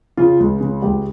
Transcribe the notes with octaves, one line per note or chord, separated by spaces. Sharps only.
C#3 F4
C#2
C#3
C#2 G4